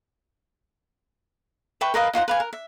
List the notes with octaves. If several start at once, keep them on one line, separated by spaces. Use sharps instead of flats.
B4 E5 G5 C#6
A#4 B4 D#5 F5
D#4 F4 C5 F#5
B4 F5 G#5
A#4
E5